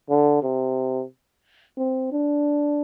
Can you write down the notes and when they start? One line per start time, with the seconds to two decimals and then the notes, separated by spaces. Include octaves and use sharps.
0.09 D3
0.43 C3
1.77 C4
2.12 D4